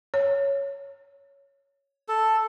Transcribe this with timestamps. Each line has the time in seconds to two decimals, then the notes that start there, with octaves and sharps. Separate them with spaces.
0.14 C#5
2.08 A4